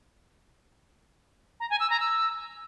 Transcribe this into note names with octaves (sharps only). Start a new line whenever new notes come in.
A#5
G#5
E6
A#5
E6